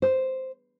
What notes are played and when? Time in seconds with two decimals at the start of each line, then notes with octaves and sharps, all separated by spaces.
0.02 C5